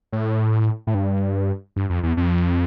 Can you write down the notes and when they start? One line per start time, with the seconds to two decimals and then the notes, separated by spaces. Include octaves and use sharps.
0.13 A2
0.87 A2
0.95 G2
1.76 G2
1.90 F2
2.03 E2
2.17 F2